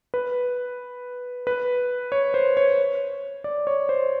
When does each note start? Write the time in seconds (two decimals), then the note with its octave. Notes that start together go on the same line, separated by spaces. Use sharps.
0.14 B4
1.47 B4
2.12 C#5
2.34 C5
2.57 C#5
3.44 D5
3.67 C#5
3.89 C5